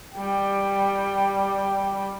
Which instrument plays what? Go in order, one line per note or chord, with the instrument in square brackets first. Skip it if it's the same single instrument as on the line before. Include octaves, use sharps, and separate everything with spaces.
[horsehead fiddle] G3 G5